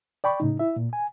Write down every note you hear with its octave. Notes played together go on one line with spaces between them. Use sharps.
D5 G5 B5 C#6
A2 C#3 D#4
E4 E5
A#2
G#5